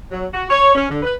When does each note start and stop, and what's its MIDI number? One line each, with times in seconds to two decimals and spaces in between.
0.11 0.26 54
0.34 0.45 66
0.50 0.73 73
0.75 0.89 61
0.90 1.00 50
1.02 1.12 71